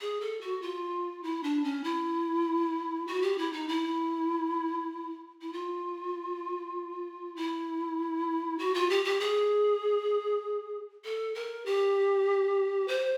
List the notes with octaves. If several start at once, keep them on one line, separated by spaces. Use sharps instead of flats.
G#4
A4
F#4
F4
E4
D4
C#4
E4
F#4
G4
E4
D#4
E4
E4
F4
E4
F#4
F4
G4
G4
G#4
A4
A#4
G4
C5